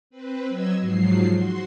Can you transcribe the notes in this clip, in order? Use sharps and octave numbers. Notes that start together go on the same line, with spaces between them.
C4 B4
F#3 D#5 E6 G#6
G#2 F3 F#3 C7
F#4 C6